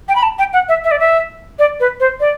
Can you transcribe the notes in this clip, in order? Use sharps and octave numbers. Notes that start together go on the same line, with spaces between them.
G5
B5
A5
G5
F#5
E5
E5
D5
E5
D5
B4
C5
D5